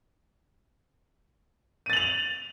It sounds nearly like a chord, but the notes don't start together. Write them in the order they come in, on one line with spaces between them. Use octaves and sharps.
D#7 A6 F#7 F7